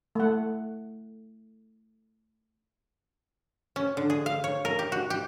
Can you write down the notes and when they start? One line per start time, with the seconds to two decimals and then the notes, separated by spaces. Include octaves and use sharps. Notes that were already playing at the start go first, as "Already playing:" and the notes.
0.15 A3 F#5
3.76 C#4
3.97 D3
4.10 G#4
4.26 F5
4.44 C#5
4.65 A#4
4.79 G4
4.92 F#4
5.10 G4